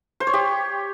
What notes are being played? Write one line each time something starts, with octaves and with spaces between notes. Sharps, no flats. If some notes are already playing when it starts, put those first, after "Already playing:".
C5
C#5
G4